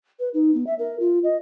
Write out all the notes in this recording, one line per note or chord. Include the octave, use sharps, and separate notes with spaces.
B4
D#4
B3
E5
A#4
F4
D#5